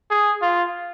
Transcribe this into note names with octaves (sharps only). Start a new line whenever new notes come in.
G#4
F4